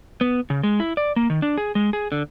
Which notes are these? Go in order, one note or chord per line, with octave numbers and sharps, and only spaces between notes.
B3
C#3
G#3
E4
D5
A#3
D#3
D4
G#4
G#3
G#4
D3